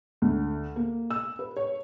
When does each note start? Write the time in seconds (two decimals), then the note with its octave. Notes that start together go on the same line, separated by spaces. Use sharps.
0.22 D2
0.76 A#3
1.10 E6
1.39 B4
1.57 C#5